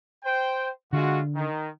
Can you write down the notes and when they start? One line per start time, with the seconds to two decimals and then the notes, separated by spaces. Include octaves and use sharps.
0.24 C5 G5
0.93 D3 G#3 F4 F#4
1.35 D#3